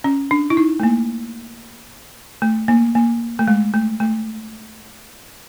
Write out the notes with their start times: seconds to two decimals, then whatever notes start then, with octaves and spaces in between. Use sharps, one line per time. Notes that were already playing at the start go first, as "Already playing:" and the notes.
0.04 C#4
0.31 D4
0.50 E4
0.57 D#4
0.80 A3
0.83 A#3
2.42 A3
2.68 A#3
2.95 A#3
3.39 A3
3.48 G#3
3.74 A3
4.00 A3